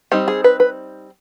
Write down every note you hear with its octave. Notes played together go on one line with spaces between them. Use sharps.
G3 C4 D#4 G4
G#4
B4
B4